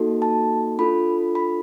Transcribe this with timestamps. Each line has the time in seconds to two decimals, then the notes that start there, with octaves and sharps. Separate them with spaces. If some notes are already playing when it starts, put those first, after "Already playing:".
Already playing: A#3 D#4 F#4 A4
0.22 A5
0.79 D4 F4 A4 B5
1.35 B5